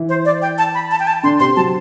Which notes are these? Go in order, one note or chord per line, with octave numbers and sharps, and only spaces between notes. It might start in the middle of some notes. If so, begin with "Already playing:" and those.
Already playing: E3 E4
C5
D5
G5
A5
B5
A5
G5
A5
D3 D4 C6
C3 C4 C6
F#3 A5